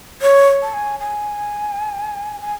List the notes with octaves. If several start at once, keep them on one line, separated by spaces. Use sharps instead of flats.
C#5
A5
G#5
G#5
G#5